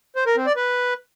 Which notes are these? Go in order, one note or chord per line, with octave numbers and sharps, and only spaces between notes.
C5
A#4
C4
D5
B4